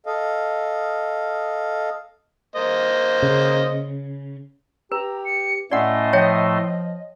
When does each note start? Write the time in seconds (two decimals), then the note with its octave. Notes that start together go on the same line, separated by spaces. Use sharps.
0.06 A4 D#5 F5
2.56 A#3 C5 D#5
3.22 C#3
4.92 G4 B4 A#5
5.25 C#7
5.71 A2 A3 C#4 D5 D#5 F#5 C6
6.13 F3 C#5 E5 G5